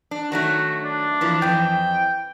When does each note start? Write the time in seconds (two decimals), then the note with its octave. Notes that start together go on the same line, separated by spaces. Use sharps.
0.11 D4
0.32 D#3 F#3 A3 F#4
0.83 D4
1.21 E3 F3 A#3
1.42 F2 E3 G5